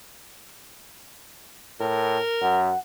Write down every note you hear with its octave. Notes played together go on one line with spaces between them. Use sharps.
A2 A#4
F#2 F#5